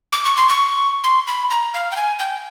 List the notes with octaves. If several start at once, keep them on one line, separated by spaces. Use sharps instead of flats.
D6
C#6
C6
C#6
C6
B5
A#5
F5
G5
G#5
G5